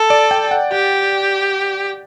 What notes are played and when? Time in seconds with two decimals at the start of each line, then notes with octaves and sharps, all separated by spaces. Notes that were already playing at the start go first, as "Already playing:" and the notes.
Already playing: A4
0.10 D5
0.31 G5
0.51 F#5
0.72 G4 F#5